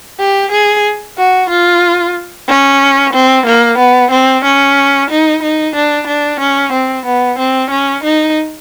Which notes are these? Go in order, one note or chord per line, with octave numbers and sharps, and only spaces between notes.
G4
G#4
F#4
F4
C#4
C4
A#3
B3
C4
C#4
D#4
D#4
D4
D4
C#4
C4
B3
C4
C#4
D#4